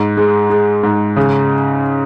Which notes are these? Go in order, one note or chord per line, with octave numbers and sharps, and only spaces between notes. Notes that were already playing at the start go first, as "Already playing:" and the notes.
Already playing: G#2
G#3
G#3
G#2
C#3